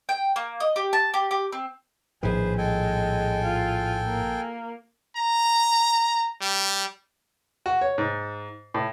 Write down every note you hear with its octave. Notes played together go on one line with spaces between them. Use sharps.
G5
A#3
D#5
G4
A5
G4
G4
C4
A#1 A2 D#3 G#4 B4 C5
G#3 A4 G5 G#5
F4
A#3
A#5
G3
F#4
C#5
G#2
A2